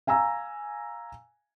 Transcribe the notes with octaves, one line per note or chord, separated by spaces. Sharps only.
F5 G#5 A#5 E6